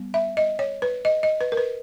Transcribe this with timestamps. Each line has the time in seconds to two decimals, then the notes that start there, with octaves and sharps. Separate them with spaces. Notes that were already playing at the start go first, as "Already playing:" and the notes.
Already playing: G3 B3
0.14 E5
0.37 D#5
0.59 C#5
0.82 B4
1.05 D#5
1.23 D#5
1.41 B4
1.52 A#4
1.57 B4